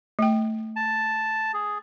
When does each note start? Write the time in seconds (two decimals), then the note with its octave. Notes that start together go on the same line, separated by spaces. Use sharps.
0.19 A3 G5
0.76 A5
1.54 G#4